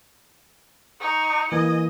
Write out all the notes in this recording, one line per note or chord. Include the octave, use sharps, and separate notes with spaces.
D#4 C#6
E3 A#3 D#5 G#5